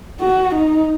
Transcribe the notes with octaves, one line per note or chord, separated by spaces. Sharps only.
F#4
D#4